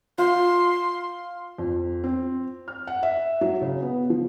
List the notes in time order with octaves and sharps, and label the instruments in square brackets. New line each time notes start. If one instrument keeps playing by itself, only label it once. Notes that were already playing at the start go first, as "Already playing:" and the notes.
[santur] F4 [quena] C6
[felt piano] F2
C4
F6
F#5
E5
F#3
C#3
B3
F3